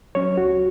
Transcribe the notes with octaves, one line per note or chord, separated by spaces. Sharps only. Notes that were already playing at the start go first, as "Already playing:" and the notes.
F#3 C#4 C#5
C#2 F#4